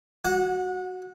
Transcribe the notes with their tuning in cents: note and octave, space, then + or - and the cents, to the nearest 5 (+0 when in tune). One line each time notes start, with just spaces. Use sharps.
F#4 +0 F#5 -25